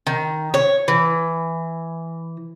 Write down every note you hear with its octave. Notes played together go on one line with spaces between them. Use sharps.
D#3
C#5
E3